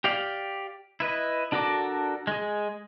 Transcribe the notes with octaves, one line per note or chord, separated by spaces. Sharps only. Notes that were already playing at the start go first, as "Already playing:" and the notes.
G4 D5 F5
E4 B4 D#5
D4 F#4 A4 A#4 D6
G#3 G#4